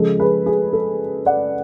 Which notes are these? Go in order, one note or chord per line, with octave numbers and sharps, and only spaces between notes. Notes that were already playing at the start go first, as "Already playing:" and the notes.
Already playing: C#3 F3 G#3 A4
G#4 B4
G#4
A4
D5 F#5